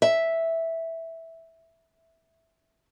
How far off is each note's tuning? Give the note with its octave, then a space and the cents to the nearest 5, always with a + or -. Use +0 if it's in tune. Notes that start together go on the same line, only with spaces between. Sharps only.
E5 -5